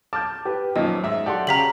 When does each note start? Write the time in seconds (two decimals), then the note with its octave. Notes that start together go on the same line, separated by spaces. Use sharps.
0.13 A5 D6 F6 G6
0.45 G4 B4
0.76 F#2 A#2 D#3 F3 D#5
1.03 G#2 E5
1.26 F#3 G4 A4 D5 F#5 C6
1.47 C#3 G4 F5 A#5 B6 F#7